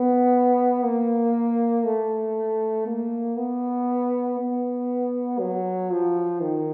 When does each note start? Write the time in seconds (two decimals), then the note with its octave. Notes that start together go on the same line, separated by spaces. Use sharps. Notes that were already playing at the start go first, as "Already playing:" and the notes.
Already playing: B3
0.85 A#3
1.85 A3
2.87 A#3
3.38 B3
4.39 B3
5.39 F#3
5.91 F3
6.41 D#3